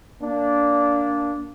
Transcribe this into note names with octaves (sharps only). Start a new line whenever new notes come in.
A#3 D4